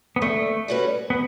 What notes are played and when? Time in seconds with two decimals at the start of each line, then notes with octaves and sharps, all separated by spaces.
0.16 B3
0.22 D3 A3
0.68 G3 C#4 F#4 B4
1.10 B3